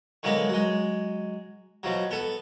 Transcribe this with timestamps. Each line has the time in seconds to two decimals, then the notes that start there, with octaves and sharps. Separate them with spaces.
0.23 D3 F#3 G#3 A#3 B3
0.49 F#3 G#3
1.83 B2 F3 F#3
2.11 B3 A4